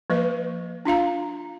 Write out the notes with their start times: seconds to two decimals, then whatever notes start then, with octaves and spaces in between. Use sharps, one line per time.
0.10 F3 A#3 B4 D#5
0.85 D4 F4 F5 A#5